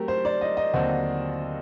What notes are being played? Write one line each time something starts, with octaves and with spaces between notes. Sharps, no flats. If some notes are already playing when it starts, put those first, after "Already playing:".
Already playing: F#3 A3 C4 G4 A#4
C5
D5
D#5
D#5
D#2 D3 F#3 C4 F#4